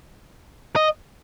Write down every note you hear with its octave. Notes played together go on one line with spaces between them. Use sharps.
D#5